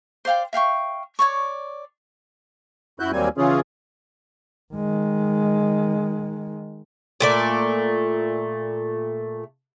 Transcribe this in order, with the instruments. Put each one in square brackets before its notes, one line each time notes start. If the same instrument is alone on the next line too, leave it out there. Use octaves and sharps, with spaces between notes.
[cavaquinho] C5 D5 F5 G5
E5 F5 G5 C#6
C#5 D5 C#6
[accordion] F#2 E4 F#4 F#6 G6
D#2 F#3 G3 A#3 C4 G#5
C#3 E3 C#4 F4 G#4
[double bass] D#3 G#3
[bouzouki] A#2 A3 D5